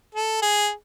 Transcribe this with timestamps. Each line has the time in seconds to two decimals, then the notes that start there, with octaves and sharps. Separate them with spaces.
0.15 A4
0.42 G#4